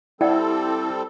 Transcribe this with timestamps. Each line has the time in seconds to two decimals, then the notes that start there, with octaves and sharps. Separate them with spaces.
0.21 G3 C4 E4 A4 D5 F#5 G5